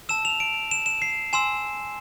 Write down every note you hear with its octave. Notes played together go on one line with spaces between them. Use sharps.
A5 E6 E7
F7
D7
E7
E7
C7
G#5 C6 E6 E7